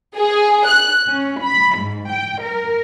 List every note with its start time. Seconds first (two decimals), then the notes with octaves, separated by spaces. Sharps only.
0.17 G#4
0.67 F#6
1.07 C#4
1.42 B5
1.76 G#2
2.10 G5
2.41 A#4